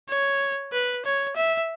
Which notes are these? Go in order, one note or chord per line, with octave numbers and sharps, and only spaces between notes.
C#5
B4
C#5
E5